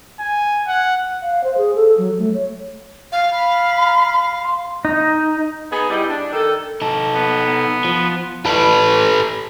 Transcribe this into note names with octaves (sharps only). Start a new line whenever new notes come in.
G#5
F#5
F5
C5
G#4
A4
F#3
A3
C#5
F5
B5
C6
D#4
B3 D#4 G#4
G3 B3 D#4 E4 G4
D4
D#3 A4
D#4 A4
B3
F3
A4 B4